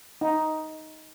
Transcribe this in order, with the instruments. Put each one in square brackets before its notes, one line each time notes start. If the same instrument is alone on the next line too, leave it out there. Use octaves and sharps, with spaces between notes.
[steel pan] D#4